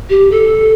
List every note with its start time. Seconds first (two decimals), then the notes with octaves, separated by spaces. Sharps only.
0.10 G4
0.31 A4